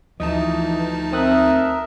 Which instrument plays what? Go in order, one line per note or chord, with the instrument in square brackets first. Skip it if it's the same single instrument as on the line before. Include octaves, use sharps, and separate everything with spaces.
[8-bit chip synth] D2 D#4 A5 [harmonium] E3 [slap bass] F3 [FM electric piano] D#5
[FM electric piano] C4 D#6 F#6 [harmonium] A#4 E5